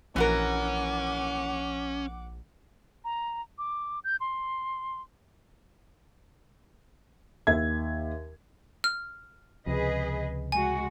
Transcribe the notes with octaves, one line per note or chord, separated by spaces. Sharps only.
A#1 E3 C#4 F#4 A#4 F#5 D6
A#5
D6
G6
C6
D#2 E5 G#6
F6
C#2 C3 F3 G#4 B4 D#5
G#3 F#4 G#5